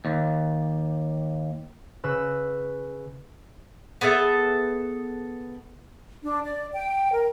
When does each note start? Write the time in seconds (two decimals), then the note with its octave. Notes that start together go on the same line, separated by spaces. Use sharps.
0.05 D#2
2.04 C#3 B4 E6
4.01 B3 G#4 A4 E5
6.23 D4
6.44 D5
6.72 G5
7.12 A#4